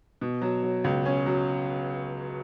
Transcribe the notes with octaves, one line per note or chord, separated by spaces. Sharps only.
B2
F#3
F#3
C#2
C#4
F#3